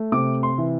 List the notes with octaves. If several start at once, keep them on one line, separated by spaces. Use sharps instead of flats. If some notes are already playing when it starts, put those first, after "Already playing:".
Already playing: A3
C3 D6
C6
E3